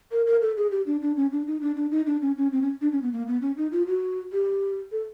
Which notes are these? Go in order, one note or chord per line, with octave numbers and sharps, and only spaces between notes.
A#4
A#4
A4
G#4
G4
D4
D4
C#4
D4
D#4
D4
D4
D#4
D4
C#4
C#4
C4
C#4
D4
C#4
B3
A#3
B3
C#4
D#4
F4
F#4
G4
A4